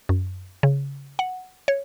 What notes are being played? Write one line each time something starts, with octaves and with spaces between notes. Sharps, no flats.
F#2
C#3
F#5
C#5